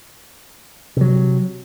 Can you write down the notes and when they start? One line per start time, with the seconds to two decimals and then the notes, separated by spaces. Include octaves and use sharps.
0.97 C3 F#3